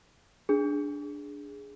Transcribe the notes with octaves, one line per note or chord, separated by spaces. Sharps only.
D4 G#4